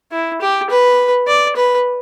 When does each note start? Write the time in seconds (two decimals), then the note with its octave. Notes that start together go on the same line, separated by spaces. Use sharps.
0.12 E4
0.41 G4
0.70 B4
1.27 D5
1.56 B4